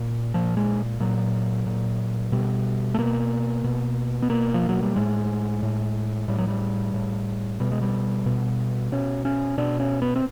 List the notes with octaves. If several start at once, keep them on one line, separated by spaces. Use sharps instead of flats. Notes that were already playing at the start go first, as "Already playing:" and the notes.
Already playing: A#2
A#2 F3
G#3
A#2 F#3
A#2
B2 G3
A3
B2 A#3
B2
B3
B2 A#3
F3
F#3
G3
A2 G#3
A2
A2 G3
F#3
G3
A2
B2 G3
G#3
G3
B2
B2 C#4
C#4
B2 D4
C#4
B3
C4